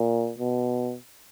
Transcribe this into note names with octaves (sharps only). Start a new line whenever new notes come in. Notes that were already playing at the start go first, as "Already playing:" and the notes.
Already playing: A#2
B2